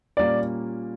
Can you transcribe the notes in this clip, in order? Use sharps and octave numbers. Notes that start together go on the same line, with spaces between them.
A#2 G3 A#3 C#4 D5